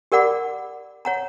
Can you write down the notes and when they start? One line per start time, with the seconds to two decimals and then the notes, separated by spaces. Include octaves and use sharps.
0.12 G4 A#4 D5 F#5 B5 D6
1.05 C#5 F#5 A#5